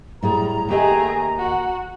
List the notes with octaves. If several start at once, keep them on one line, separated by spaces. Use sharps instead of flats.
A2 G3 G#4 A#5
D#2 A3 G4 G#4 D#5
F#4 F#5